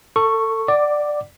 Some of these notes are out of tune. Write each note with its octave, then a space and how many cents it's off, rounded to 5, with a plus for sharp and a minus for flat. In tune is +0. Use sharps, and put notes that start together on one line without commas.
A4 +30 C#6 +0
D5 +10 F#5 +15 D6 +0